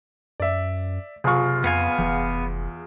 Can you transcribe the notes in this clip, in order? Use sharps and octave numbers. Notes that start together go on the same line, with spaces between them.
F#2 D5 E5
F#1 C3 F4 G#4 C#6
F2 B3 F5 G#5
F1 E2